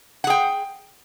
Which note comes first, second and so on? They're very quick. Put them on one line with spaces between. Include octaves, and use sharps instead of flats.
F#5 G#4 G5